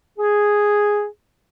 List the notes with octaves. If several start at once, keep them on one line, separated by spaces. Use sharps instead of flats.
G#4